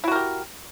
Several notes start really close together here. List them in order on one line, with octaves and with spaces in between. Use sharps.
E4 F#4 A#4 G4